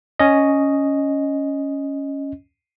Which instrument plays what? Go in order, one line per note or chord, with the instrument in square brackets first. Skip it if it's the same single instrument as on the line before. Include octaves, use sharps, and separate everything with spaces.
[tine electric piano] C#4 D#5